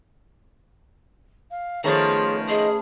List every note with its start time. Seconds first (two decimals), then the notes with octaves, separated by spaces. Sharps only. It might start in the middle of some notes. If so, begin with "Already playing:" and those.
1.50 F5
1.84 D#3 F3 A3 B3 C#4 G#4 C#5
2.49 G#4 D#5